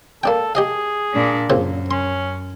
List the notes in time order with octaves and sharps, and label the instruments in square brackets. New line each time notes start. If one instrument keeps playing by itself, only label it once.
[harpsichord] A#3 D4 G5 [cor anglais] A4
[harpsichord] G4 D#5 F5 [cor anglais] G#4
[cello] A#2 D4
[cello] F#2 [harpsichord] A#2 C#3 C4
[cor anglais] C#4 [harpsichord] C6